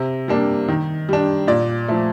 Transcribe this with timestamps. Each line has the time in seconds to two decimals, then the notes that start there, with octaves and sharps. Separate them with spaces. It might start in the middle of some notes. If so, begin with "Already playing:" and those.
Already playing: C3
0.28 G3 A#3 D4
0.68 D#3
1.09 G3 D4
1.48 A#2 D5
1.89 F3 A3